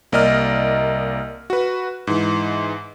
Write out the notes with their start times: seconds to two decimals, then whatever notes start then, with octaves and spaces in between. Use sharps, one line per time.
0.12 C2 A#3 D5 D#5 A#5 F6
1.50 F#4 B4
2.07 G#2 E3